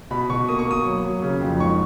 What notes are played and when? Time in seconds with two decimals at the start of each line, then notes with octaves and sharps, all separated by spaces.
0.11 B2 B5
0.30 B2 C#6
0.48 A#3 D#6
0.59 C#6
0.68 A#3 D#6
0.86 F#3
1.04 F#3
1.22 C#3
1.41 F2
1.60 G#2 C#6